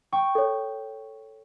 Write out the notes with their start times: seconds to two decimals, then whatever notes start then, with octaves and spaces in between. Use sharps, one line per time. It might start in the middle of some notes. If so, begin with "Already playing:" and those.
0.12 G5 C#6
0.35 A4 C#5